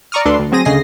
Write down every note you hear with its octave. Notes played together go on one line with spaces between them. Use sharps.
D5 A#5 C#6 D#6 F6
D2 D3 D4 A4 B4 C6
D2
F#3 C4 G#4 A#6 D#7
D2 C#3 G#4 D#5 A#6 C7